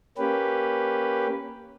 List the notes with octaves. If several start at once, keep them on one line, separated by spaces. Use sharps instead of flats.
A#3 C#4 G4 B4